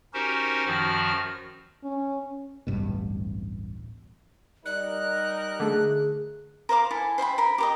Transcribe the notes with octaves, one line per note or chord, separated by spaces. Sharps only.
C#4 D#4 F#4 G4 A#4 C5
F#2 D#3 F3 F#4 F6
C#4
D1 A1 G2 B2
G3 D#4 A#4 D5 F#6
D3 A3 G#4
A#4 C5 F5 D6
E4 A4 G#5 A5
C5 E5 G5 B5
A#4 B5
G4 A#4 D#5